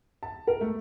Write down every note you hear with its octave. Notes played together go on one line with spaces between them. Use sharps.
A5
A#4
A3